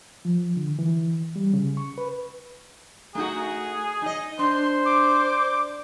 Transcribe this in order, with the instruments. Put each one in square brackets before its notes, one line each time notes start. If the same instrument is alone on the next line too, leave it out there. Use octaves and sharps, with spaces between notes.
[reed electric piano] F3
D3
E3
G3
C#3
C#6
B4
[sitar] A3 D#4 F#4 [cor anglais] G#4
[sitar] D#4 D#5
[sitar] D4 [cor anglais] C5 [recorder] C6
[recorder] D6